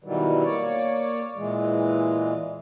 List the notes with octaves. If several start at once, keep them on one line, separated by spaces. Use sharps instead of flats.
B2 D#3 E3 F#3 G3
A#3 C#5 D5
A#2 E3 G#3